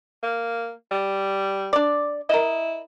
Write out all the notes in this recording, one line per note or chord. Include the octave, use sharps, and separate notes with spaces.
A#3
G3
D4 D5
E4 A#4 D#5